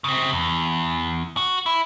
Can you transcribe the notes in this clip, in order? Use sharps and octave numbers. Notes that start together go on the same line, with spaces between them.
C#3 C4
E2
F#4
E4